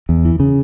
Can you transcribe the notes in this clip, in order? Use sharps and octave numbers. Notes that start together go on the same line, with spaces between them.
E2
E3
C#3